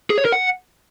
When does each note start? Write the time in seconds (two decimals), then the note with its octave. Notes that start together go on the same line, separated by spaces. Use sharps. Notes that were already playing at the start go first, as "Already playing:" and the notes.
0.10 G#4
0.18 C#5
0.25 A#4
0.33 F#5